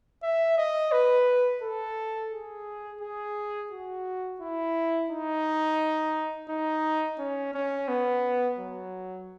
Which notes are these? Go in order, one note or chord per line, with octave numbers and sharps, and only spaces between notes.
E5
D#5
B4
A4
G#4
G#4
F#4
E4
D#4
D#4
C#4
C#4
B3
F#3